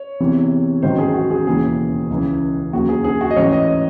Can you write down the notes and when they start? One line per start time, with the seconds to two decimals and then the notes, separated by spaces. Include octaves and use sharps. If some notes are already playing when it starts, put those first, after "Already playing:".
Already playing: C#5
0.20 E2 C3 E3
0.82 A1 G#2 D#3 F#3 C5
0.98 G#4
1.14 F#4
1.30 G#4
1.46 E1 D#2 C#3 E3 G#4
2.10 C#2 C#3 E3
2.73 D#2 C#3 F#3 F#4
2.89 G#4
3.04 G#4
3.21 F#4
3.31 D#5
3.36 A1 G#2 E3 C#5
3.53 D#5
3.68 D#5